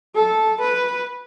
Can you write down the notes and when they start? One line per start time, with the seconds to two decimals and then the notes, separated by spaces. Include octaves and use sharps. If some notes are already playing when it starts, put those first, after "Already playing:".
0.15 A4
0.61 B4